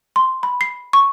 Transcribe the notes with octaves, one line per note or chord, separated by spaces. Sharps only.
C6
B5
C7
C#6